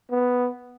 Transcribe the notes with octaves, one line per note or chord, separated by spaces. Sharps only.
B3